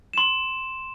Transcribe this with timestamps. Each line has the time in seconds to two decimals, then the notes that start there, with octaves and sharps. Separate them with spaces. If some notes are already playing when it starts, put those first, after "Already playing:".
0.13 C6 E7